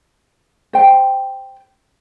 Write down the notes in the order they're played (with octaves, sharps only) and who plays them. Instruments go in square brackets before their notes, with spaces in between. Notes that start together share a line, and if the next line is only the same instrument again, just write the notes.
[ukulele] C5 G5